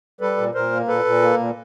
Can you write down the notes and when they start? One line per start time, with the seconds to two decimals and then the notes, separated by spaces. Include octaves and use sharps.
0.21 G3 A4 B4
0.37 A#2
0.54 A#2 A#4 C5
0.72 A#3
0.88 A#2 A4 B4
1.05 A#2
1.22 A#3
1.39 A#2